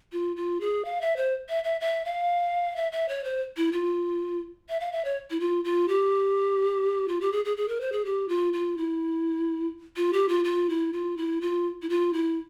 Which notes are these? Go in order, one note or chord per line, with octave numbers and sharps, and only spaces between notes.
F4
F4
G#4
F5
E5
C5
E5
E5
E5
F5
E5
E5
C#5
C5
E4
F4
E5
F5
E5
C#5
E4
F4
F4
G4
F4
G4
G#4
G#4
G#4
A#4
C5
G#4
G4
F4
F4
E4
F4
G4
F4
F4
E4
F4
E4
F4
E4
F4
E4